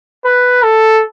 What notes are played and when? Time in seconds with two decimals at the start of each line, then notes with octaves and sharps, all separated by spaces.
0.24 B4
0.63 A4